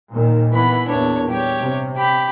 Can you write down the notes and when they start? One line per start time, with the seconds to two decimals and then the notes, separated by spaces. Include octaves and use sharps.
0.13 D#2 A#2 D#3
0.53 E3 B3 B5
0.87 E2 A#2 D4 C#5
1.29 G3 G4 C#5
1.59 C3
1.97 G4 B5